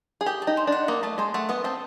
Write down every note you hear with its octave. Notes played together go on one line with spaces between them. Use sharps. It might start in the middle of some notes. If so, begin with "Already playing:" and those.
G#4
G4 D#5
A5
D#4
C5
D4 F#5
A#3 D#5
A3 A5
G#3 C5
A3 F#5
B3 D#5
C4 A5